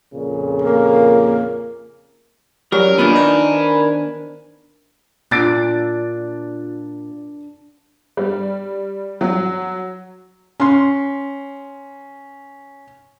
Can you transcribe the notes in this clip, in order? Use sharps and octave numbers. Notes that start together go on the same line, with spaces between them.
F2 A#2 C#3
A#3
F#3 G3 C#4 A#4
A#2 D#3 B3 D4 G#5 B5 D#6
D#4 A#4 C5
A#2 D4 F4 E6 F#6 A6 D7
G3
F#3
C#4 C6